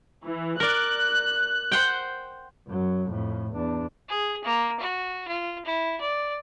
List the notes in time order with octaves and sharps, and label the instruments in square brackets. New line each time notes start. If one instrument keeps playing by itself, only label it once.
[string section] E3
[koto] A#4 D5 [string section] F#6
[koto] C5 F#5 G5
[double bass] F#2 F#3
F2 A2
E2 D4
[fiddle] G#4
A#3
F#4
F4
E4
D5